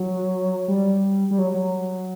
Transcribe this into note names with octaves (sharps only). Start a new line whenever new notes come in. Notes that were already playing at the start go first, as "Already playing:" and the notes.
Already playing: F#3
G3
G3
F#3
F#3